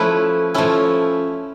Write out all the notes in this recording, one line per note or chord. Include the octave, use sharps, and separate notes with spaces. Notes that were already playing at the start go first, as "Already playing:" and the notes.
Already playing: F3 A3 C#4 E4 B4
F3 A3 C#4 E4